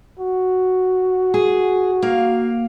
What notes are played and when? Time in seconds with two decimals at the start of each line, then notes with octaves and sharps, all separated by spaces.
0.19 F#4
1.34 G#4
2.02 A#3 F5